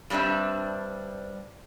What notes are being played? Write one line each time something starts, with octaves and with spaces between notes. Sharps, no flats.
G2 G3 C4 D4 E5